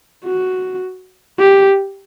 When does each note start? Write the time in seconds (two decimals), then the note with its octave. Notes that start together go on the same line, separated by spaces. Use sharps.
0.25 F#4
1.39 G4